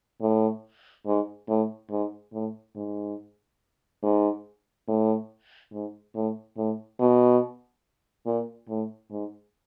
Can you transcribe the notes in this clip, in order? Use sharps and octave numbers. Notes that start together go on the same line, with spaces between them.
A2
G#2
A2
G#2
A2
G#2
G#2
A2
G#2
A2
A2
B2
A#2
A2
G#2